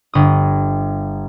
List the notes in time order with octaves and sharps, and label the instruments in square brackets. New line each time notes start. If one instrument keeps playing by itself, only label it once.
[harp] G1 D#6